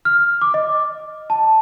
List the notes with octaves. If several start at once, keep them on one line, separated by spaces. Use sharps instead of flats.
F6
D6
D#5
A5